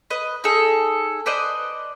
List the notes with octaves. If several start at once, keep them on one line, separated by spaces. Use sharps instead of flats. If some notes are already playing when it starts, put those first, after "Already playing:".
B4 D#5
D#4 G#4 A4
B4 C5 D5 D#5